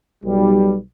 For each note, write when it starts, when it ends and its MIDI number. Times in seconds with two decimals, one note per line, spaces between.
0.24 0.76 35
0.24 0.76 55